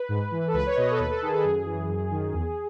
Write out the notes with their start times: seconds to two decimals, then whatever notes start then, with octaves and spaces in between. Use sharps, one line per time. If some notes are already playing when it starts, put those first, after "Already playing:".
Already playing: B4
0.09 G#2
0.31 E3
0.47 A4
0.53 C#2 B4
0.66 C#5
0.76 B2 D#5
0.91 A4
0.98 D#2 B4
1.10 A4
1.22 D#3 G#4
1.33 A4
1.44 F#2 G#4
1.65 E3
1.89 F#2
2.11 D#3
2.33 E2